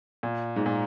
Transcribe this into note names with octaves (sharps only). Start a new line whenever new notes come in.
A#2
G#2
A#2